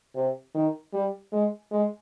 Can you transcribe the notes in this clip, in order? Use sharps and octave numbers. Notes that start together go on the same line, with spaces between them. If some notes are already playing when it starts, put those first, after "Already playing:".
C3
D#3
G3
G#3
G#3